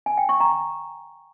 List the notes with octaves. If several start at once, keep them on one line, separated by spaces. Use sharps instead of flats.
G#5
G5
C#6
A#5